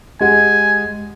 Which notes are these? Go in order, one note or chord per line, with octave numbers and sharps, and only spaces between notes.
G#3 G4 G#4 F#5 G#5